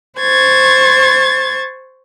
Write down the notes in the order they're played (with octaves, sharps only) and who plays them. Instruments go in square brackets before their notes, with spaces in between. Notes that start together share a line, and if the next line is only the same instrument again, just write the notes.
[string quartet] C5 C#6 G#6 A6